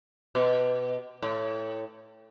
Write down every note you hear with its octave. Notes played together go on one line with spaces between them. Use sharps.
B2
A2